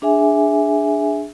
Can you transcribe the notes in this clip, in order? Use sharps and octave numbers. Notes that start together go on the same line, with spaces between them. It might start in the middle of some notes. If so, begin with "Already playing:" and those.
D4 G#4 E5 G#5